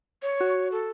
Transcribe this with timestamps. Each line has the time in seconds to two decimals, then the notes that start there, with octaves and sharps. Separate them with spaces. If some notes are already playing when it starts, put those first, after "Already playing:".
0.22 C#5
0.40 F#4 C#6
0.72 A4